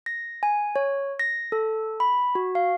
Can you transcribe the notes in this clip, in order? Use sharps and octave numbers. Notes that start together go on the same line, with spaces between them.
A#6
G#5
C#5
A#6
A4
B5
F#4
F5